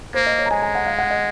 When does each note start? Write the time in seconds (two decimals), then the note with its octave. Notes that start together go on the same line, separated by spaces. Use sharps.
0.14 A#3 C5
0.26 D#5
0.38 C#5
0.46 A#5
0.51 G#3 G#5
0.62 G#5
0.75 F#5
0.86 F5
0.99 F#5
1.10 D#5